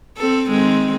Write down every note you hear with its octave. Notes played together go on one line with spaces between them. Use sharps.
C4 A4
D#3 G#3 C4